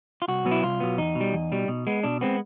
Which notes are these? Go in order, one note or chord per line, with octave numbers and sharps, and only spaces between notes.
F4
C2 F#4
B2 F#3 B3
E4
C2 F4
B2 F#3 B3
E2 D#4
B2
G3
E2
B2 G3
B2
G#3 B3
B2 D4
G#3 B3 C4